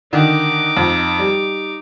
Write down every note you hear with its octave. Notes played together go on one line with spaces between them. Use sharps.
D3 D#3 D#4 D6
F2
G3